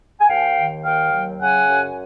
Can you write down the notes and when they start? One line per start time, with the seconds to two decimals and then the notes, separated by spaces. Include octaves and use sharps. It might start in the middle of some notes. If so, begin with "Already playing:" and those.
0.20 G#5
0.27 D#2 F5 G5
0.55 D#3
0.84 D#2 F5 G5
1.13 F#3
1.41 C#3 F#5 G#5
1.70 F#2